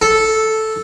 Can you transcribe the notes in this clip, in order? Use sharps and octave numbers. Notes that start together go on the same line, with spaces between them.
A4